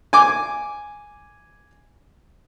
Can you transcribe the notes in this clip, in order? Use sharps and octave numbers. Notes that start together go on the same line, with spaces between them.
G#5 D6